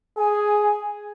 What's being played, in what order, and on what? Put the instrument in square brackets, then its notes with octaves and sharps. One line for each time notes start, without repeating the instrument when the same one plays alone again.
[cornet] G#4 [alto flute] G#5